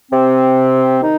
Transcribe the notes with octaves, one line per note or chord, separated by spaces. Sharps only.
C3 C4
D#3 D#4